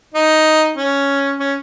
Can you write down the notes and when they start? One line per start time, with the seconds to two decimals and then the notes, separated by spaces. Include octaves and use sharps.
0.14 D#4
0.77 C#4
1.40 C#4